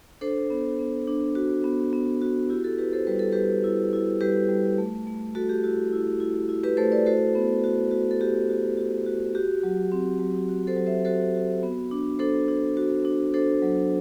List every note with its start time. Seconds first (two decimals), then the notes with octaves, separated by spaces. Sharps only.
0.21 D4 A4 C5
0.50 B3
0.79 B3
1.08 D4
1.35 F#4
1.64 B3
1.93 B3
2.22 F#4
2.50 E4 G4
2.64 F#4 A4
2.78 E4 G4 B4
2.93 A4 C5
3.07 G3 B4
3.19 A4
3.32 G3 G4 B4
3.64 E4
3.93 E4
4.21 G3 G4 B4
4.49 G3
4.78 A3
5.07 A3
5.35 A3 F#4 A4
5.49 G4
5.64 E4 F#4
5.93 E4
6.20 E4
6.49 E4
6.64 G4 B4
6.77 A3 A4 C5
6.92 B4 D5
7.06 F#4 A4 C5
7.35 B3
7.64 F#4
7.91 F#4
8.11 A4
8.21 F#4 G4
8.49 F#4
8.77 F#4
9.06 F#4
9.35 F#4 G4
9.63 F#3
9.92 C4
10.20 F#3
10.49 F#4
10.67 A4 C5
10.77 F#3
10.87 C5 E5
11.05 F#4 A4 C5
11.35 F#4
11.63 B3
11.91 D4
12.19 D4 A4 C5
12.48 D4
12.77 F#4
13.05 D4
13.34 D4 A4 C5
13.62 F#3